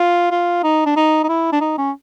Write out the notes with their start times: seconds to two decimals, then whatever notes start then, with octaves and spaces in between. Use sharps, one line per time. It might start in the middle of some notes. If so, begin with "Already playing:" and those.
Already playing: F4
0.31 F4
0.63 D#4
0.86 D4
0.96 D#4
1.23 D#4
1.29 E4
1.52 D4
1.61 D#4
1.78 C#4